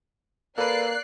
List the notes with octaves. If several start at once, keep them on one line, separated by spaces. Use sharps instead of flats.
A#3 A4 B4 D5 F#6 C7